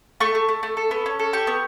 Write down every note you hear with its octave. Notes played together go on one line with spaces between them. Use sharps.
A3 C#6
A3
A3
A3
A4
B3
C#4
A4
G4 C#6
B3